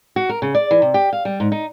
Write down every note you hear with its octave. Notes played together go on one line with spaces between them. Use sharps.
F#4
A#4
C#3
D5
E3
C3
G4
F5
G3
G#2
D#4